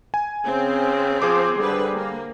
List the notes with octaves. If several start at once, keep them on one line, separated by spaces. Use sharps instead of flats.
G#5
C#3 C4
F3 G#4 C5 D6
D3 G3 B4
A#3